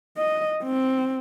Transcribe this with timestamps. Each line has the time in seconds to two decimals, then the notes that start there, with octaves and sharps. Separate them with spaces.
0.18 D#5
0.63 C4